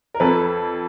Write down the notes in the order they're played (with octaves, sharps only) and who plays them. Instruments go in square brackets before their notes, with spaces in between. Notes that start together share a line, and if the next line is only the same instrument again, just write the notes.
[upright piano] A#4
[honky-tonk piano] F2 [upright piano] A4 B4